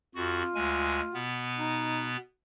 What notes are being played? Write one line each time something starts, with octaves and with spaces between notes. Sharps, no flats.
F2 F4 F#4
D2 G#3 G#5
B2 B3
D#4